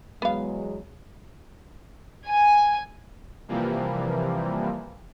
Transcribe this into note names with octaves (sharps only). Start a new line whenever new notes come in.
E2 F#3 G#3 B3 F5
G#5
C3 E3 F3 G3 A#3